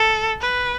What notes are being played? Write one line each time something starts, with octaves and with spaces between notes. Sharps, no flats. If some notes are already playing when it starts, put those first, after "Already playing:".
Already playing: A4
B4